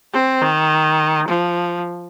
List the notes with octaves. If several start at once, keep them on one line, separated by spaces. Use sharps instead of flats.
C4
D#3
F3